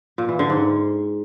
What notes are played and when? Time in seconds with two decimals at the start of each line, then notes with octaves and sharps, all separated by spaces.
0.18 A#2
0.29 E3
0.39 D3
0.50 G#2